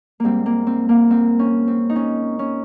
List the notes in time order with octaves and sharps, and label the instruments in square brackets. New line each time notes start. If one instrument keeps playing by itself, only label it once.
[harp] G#2 G3 A#3 C4
A#3
C4
A#3
C4
C#4
C4
D#4
C#4
C#4